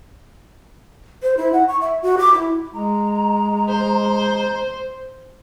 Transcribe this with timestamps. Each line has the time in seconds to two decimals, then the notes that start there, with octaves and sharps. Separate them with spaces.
1.23 C5
1.37 E4
1.53 F#5
1.68 C#6
1.81 E5
2.02 F#4
2.18 D6
2.34 E4
2.74 G#3 A#5
3.69 C5